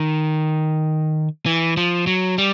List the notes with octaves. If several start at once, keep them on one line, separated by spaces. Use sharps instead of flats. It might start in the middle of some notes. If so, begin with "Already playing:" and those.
Already playing: D#3
E3
F3
F#3
G3